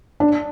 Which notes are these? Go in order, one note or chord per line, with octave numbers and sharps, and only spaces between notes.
D4